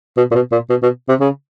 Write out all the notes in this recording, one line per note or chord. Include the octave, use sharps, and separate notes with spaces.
B2
A#2
B2
A#2
B2
B2
C3
C#3